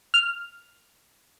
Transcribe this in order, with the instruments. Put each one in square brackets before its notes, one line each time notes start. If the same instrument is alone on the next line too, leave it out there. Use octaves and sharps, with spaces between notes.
[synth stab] F6